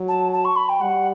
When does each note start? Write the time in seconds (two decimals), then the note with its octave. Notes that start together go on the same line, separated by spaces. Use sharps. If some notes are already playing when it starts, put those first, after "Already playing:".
Already playing: F#3
0.08 A5
0.33 A5
0.45 C#6
0.56 B5
0.69 G5
0.81 G3 F#5